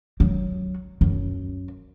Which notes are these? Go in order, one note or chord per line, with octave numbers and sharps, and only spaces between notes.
F#3
F#2